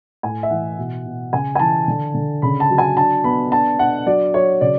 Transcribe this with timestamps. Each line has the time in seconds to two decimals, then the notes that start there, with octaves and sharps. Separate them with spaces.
0.23 A2 G#5
0.43 E5
0.50 E3 F#5
0.78 B2
1.06 B2
1.33 C#3 G#5
1.55 G#5
1.59 E3 A5
1.88 D3
2.14 D3
2.42 C#3 B5
2.60 A5
2.70 F#3
2.78 G#5
2.97 D4 A5
3.24 B3 B5
3.51 D4 A5
3.79 D4 F#5
4.06 F#3 D5
4.34 F#3 C#5
4.61 C#3 D5